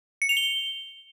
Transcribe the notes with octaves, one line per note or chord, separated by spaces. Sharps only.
C#7
F7
G7